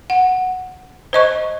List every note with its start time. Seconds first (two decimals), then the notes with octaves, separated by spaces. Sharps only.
0.10 F#5
1.13 C5 D#5 C#6